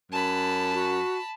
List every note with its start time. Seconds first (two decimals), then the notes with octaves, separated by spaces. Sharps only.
0.12 F#2 A5 B5
0.73 F#4